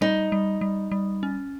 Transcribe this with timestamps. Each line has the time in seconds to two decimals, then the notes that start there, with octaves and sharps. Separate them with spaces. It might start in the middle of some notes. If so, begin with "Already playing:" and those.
0.01 G3 D#4
0.32 G3
0.61 G3
0.92 G3
1.23 C#4